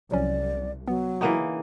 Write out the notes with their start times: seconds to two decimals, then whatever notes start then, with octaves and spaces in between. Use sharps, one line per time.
0.11 C2 F3 F#3 C#4 D5
0.88 F#3 B3
1.21 C#3 E3 A#3 D#4 F4 F#5 D#7